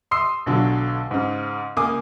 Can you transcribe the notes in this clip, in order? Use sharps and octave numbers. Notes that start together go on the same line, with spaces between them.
C6 D#6 E6 C7
B1 D3 F#3
G#2 C#3
C#2 A#3 G#5 D6 D#6